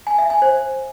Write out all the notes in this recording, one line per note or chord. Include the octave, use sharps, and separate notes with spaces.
G#5
E5
G#5
C5